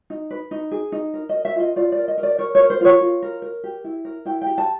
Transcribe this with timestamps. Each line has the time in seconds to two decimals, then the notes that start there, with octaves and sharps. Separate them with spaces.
0.10 D#4
0.31 B4
0.51 D#4
0.71 G#4
0.92 D#4
1.14 A#4
1.29 D#5
1.35 A#4
1.45 E5
1.56 F4 D#5
1.76 F4 D5
1.92 D5
1.97 A#4
2.08 D#5
2.18 A#4
2.23 D5
2.38 A#4 C#5
2.55 C#5
2.60 A#4
2.70 C5
2.81 F4 C#5
3.01 F4
3.22 A#4
3.42 A#4
3.64 G4
3.84 E4
4.05 A#4
4.25 E4 G5
4.42 G4 G5
4.58 A5